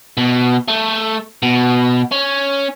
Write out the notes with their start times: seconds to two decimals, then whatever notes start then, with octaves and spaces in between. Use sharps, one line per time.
0.17 B2
0.68 A3
1.42 B2
2.11 C#4